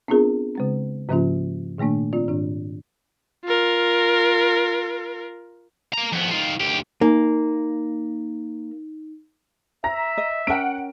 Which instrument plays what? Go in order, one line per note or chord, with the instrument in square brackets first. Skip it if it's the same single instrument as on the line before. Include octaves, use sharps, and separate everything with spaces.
[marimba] B3 C4 D4 F4 G#4 A#4
C#3 G#3 C4
G#2 C#3 F3 A#3 C#4 F4
A#2 D#3 A3 A#3 D4
C4 F4 D5
G#2 D#3 D4
[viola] F4 A#4
[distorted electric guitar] A#3 A#5
F2 B3
D#3 F4
D2 G4
[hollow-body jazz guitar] A#3 [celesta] D#4
[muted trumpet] E5 [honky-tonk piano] A#5 A#6
[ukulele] D#5
[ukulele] C#4 A#4 G5 [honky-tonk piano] F#5 D7